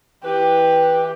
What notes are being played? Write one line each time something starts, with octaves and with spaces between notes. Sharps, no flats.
E3 G4 B4